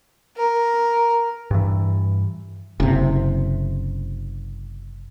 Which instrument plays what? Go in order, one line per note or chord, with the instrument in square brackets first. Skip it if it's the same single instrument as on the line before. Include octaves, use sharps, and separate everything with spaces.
[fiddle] A#4
[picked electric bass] G2 E3
[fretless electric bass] F#1 C3